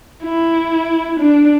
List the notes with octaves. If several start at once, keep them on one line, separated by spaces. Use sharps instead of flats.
E4
D4